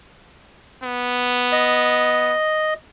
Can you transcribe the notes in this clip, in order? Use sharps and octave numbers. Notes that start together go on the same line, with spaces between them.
B3
D#5